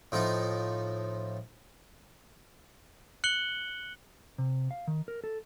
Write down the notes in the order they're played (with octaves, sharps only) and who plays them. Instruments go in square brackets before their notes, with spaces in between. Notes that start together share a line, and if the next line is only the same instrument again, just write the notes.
[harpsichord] A2 F3 D#4
[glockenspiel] F#6 C#7 F#7 G7
[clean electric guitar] C3
F5
D#3
A#4
A4